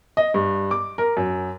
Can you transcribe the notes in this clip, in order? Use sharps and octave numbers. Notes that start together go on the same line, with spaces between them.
D#5
G2
D6
A#4
F#2